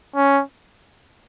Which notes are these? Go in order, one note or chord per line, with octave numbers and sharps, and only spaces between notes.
C#4